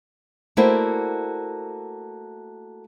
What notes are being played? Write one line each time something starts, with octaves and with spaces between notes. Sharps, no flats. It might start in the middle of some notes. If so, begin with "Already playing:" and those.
A3 A#3 E4 F#4 C5 D5